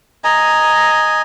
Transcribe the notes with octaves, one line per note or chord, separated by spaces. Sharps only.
D#5 G#5 A#5